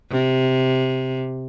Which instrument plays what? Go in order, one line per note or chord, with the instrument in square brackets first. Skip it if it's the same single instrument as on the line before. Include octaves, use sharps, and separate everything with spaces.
[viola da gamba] C3